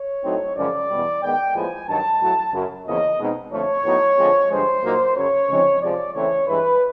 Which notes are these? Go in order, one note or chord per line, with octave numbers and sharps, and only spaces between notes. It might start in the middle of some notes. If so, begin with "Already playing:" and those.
Already playing: C#5
A2 F#3 A3 C4 D#4
F#2 C#3 F3 G#3 D5
E2 B2 G3
D#3 G#3 B3 G5
A2 F3 G#3 B3 G#5
G2 D#3 F#3 A5
A2 F#3 A3
F#2 C#3 F#3
E2 C#3 F3 A#3 C#4 D#5
B2 G#3 C4 D#4
F2 D3 F3 A3 C#5
A2 F#3 B3 D#4
D3 F3 G#3 C4
G2 D3 F3 G#3 C5
A#2 F#3 A#3 D#4
F#2 C#3 F#3 C#5
C#3 F3 G#3 C4 D#4
C3 F3 G#3 D5
C#3 E3 A3 C4 C#5
G2 E3 G#3 B4